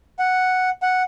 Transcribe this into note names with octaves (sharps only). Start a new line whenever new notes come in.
F#5
F#5